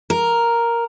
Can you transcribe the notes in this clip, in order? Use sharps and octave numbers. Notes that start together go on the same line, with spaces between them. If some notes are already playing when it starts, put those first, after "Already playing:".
A#4